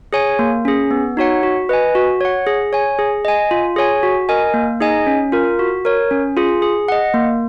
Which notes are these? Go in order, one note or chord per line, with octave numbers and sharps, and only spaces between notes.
G#4 C#5 G#5
A#3
C#4 G#4
B3
D#4 F#4 C#5 F#5
F#4
B4 D#5 G#5
F#4
C#5 F#5
G#4
C#5 G#5
G#4
D#5 G#5
F4
G#4 C#5 G#5
F#4
A#4 D#5 G#5
A#3
D#4 G#4 D#5 G#5
C#4
F4 A#4
F#4
A#4 C#5
C#4
F4 G#4
G#4
D#5 F#5
A#3